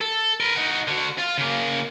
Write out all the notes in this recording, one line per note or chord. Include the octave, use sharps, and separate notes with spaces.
A4
A#4 B4
D#4 F#4
D3 F#4
F4
C#3 A#3